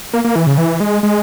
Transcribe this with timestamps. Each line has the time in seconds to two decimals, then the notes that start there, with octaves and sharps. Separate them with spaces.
0.13 A#3
0.24 A#3
0.36 E3
0.47 C#3
0.58 E3
0.80 G#3
1.03 G#3